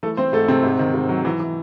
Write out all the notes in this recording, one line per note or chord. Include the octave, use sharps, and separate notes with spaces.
E3 A3 A4
E3 C4 C5
G#2 A3 A4
G#2 C3 C4
G#2
D#3
G#2
F#3
E3
E3